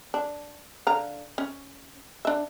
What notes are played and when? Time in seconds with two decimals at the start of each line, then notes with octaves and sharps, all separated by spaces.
0.14 D4
0.87 D3 F5 A#5
1.38 C#4
2.25 D4 E5